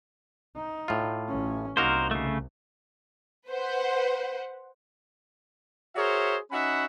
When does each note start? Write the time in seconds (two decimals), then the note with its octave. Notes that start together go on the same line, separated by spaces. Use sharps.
0.56 D#4
0.88 A2 F4
1.28 A1 C#4
1.77 C2 A#3 D#4 F#4 A#4 C5
2.11 C#3 A3
3.48 B4 C5 F#5
5.96 F#4 G#4 A#4 C5 C#5 E5
6.52 C#4 D#4 F#4 E5 F#5 B5